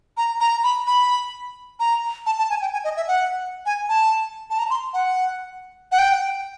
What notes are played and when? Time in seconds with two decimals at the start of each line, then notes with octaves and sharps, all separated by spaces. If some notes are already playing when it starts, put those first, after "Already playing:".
0.17 A#5
0.41 A#5
0.64 B5
0.87 B5
1.80 A#5
2.26 A5
2.38 A5
2.50 G#5
2.61 G5
2.73 G#5
2.84 D#5
2.97 E5
3.08 F#5
3.66 G#5
3.89 A5
4.50 A5
4.59 A#5
4.70 C6
4.94 F#5
5.92 F#5
5.98 G5